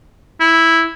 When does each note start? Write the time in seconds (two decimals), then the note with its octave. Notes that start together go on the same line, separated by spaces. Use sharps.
0.40 E4